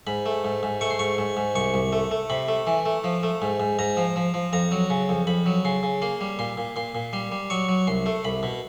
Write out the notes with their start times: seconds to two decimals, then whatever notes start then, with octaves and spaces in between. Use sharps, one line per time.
0.07 G#2 B5
0.26 A3
0.45 G#2
0.63 G#2
0.81 A3 C#6
0.90 C6
0.99 G#2 C#6
1.18 G#2
1.37 G#2
1.55 C2 C#6
1.74 C2
1.92 A3
2.11 A3
2.30 C3 B5
2.48 A3
2.67 E3
2.86 A3
3.04 F3
3.23 A3
3.42 G#2
3.60 G#2
3.79 G#2 A#5
3.97 F3
4.16 F3
4.34 F3
4.53 F2 A#5
4.72 F#3
4.90 C#3
5.09 F2
5.27 F2 B5
5.46 F#3
5.65 C#3 C6
5.83 C#3
6.02 A#3 C6
6.21 G3
6.39 A#2 C6
6.57 A#2
6.76 A#2 C6
6.95 A#2
7.13 G3 C6
7.32 G3
7.50 F#3 C#6
7.68 F#3
7.87 C2 C6
8.06 A3
8.25 C2 B5
8.43 B2